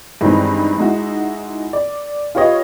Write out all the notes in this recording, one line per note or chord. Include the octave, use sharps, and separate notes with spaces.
G2 D#3 E3 G#3 C4 D#4
G#3 D#4 E4 F#4
D5
F4 G4 B4 C#5 D#5